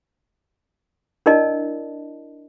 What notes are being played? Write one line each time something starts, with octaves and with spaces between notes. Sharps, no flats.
D4 E4 A#4 D5 D#5 A5